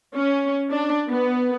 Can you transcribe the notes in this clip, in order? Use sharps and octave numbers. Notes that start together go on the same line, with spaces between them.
C#4
D4
B3